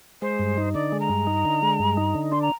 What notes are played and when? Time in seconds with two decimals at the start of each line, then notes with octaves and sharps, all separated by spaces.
0.22 G#3 C5
0.39 G2
0.58 D#4
0.74 D3 D5
0.92 G#3
1.00 A#5
1.09 G2
1.27 D#4
1.45 D3
1.63 G#3
1.79 G2
1.97 D#4
2.15 D3
2.32 D4 C6
2.42 A#5